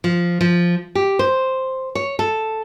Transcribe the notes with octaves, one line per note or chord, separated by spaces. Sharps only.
F3
F3
G4
C5
C#5
A4